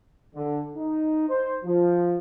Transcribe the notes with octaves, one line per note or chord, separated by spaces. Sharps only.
D3
D#4
C5
F3